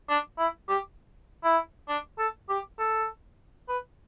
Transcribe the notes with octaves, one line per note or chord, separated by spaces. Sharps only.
D4
E4
G4
E4
D4
A4
G4
A4
B4